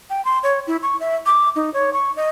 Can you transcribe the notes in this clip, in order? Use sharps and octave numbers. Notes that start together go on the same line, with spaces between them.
G5
C6
C#5
E4
C#6
E5
D6
D#4
C#5
C#6
D#5